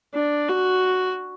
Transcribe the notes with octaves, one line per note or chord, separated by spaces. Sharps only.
D4
F#4